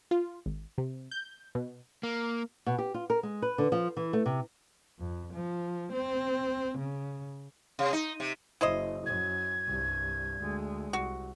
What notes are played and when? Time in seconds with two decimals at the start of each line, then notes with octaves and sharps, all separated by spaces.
0.11 F4
0.46 G#1
0.78 C3
1.11 G6
1.55 B2
2.03 A#3
2.66 B2
2.78 G4
2.94 F4
3.10 A#4
3.23 G#3
3.42 B4
3.58 D3
3.72 F3
3.97 E3
4.13 A3
4.26 C3
4.99 F2
5.34 F3
5.92 C4
6.78 C#3
7.79 C3
7.93 D#4
8.20 C3
8.61 F#1 E4 C5 D#5
9.06 F#2 G#6
9.66 C2 G2
10.39 D2 G#3
10.93 C2 F#4